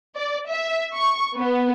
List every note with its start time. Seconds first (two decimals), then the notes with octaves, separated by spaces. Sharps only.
0.16 D5
0.50 E5
0.94 C#6
1.38 B3